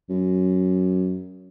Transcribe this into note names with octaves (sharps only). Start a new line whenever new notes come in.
F#2